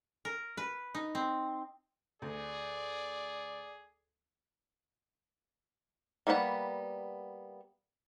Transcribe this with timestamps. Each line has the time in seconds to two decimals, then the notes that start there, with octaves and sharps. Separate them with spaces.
0.25 A#4
0.57 B4
0.95 D#4
1.15 C4
2.22 D2 G#4 D5
6.27 G3 A#3 B3 E4 F#5